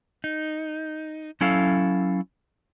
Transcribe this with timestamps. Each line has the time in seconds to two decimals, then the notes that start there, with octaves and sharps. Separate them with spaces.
0.24 D#4
1.41 F#3 C#4 E4 A4 F5